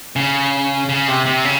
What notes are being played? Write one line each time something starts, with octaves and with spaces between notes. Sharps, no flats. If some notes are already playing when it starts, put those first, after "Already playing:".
C#3
C#3
C3
C3
C#3